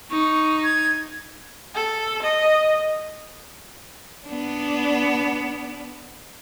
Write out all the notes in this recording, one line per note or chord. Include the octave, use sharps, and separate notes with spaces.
D#4 C#6
G#6
A4
D#5
B3 D4